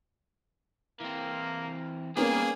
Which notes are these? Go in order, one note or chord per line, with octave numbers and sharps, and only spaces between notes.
E3 A#3 C4
G3 A#3 B3 C#4 G#4 A#4